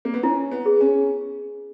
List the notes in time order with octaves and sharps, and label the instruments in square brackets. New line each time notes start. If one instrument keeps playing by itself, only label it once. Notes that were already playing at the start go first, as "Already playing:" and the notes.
[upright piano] A#3
B3
[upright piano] C#4 [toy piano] E4
[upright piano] B3
[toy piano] G#4
[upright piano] C#4